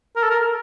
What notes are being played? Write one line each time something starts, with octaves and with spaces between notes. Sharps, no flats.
A#4
A4
A#4